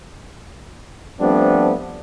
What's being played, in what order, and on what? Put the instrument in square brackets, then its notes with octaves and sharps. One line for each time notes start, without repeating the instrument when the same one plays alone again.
[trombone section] F3 G3 A3 B3 C4 D4